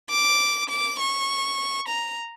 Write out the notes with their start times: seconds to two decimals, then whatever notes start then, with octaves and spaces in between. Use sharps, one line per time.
0.10 D6
0.70 D6
1.00 C#6
1.88 A#5